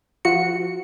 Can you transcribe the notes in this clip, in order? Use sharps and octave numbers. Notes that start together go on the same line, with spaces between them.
F3 F#4 C#7